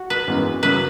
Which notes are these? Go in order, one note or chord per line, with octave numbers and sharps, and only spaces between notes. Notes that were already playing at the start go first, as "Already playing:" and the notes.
Already playing: F#4
B4
G#1 F#2 E3 G#3 B3
F#2 C#3 F#3 A#3 B4